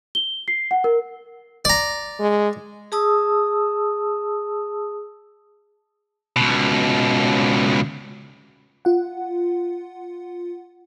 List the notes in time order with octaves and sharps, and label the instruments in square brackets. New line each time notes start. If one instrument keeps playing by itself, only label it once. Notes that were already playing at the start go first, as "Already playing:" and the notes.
[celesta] G7
C7
F#5
A#4
[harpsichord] D5 A#5
[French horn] G#3
[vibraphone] G#4 A5 D#6 E6
[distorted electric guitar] C#2 B2
[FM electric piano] F4 F#5